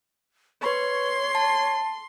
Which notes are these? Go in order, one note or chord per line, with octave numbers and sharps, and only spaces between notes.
B4 C#5 C6 C#6
A5